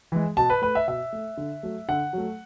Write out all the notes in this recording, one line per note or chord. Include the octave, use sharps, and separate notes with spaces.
E3 G#3
B2 A5
B4
A3 B4
E5
B2 E5
A3
D3
F#3 A3
D3 F#5
F#3 A3